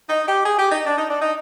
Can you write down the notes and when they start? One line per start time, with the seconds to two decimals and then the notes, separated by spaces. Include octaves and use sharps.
0.09 D#4
0.27 G4
0.46 G#4
0.58 G4
0.71 D#4
0.85 D4
0.98 D#4
1.10 D4
1.22 D#4